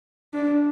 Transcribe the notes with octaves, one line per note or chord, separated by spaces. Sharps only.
D4